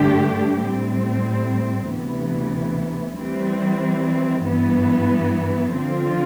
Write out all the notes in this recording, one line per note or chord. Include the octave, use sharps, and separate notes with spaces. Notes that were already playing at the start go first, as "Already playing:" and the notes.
Already playing: G2 D3 A3 D4 G4
A2 G3 C4
D2 C3 E3 B3
E3 G3 C4
G2 E3 B3
D3 F3 C4 F4